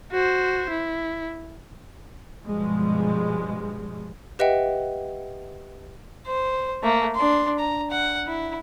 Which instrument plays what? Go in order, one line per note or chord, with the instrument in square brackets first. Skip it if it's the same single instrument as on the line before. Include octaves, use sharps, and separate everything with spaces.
[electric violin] F#4 C5
E4
[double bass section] G2 B2 F3 G3 G#3
[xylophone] G4 B4 D#5 E5 F#5 G5
[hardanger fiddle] C5
A3 A#3
D4 C6
A#5
F#5
E4